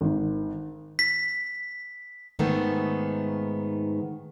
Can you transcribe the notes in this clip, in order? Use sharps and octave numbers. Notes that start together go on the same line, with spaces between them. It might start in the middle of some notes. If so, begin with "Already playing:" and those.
G#1 D#3
B6
G#2 D#3 A3 B3